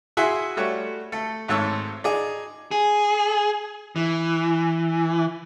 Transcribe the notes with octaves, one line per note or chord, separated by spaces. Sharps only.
E4 F#4 G#4 E5 G#5 C6
G3 A3 F#4 C#5
A3 A4
G#1 G#2 A3 A4 C#5 E6
D#4 G#4 D5
G#4
E3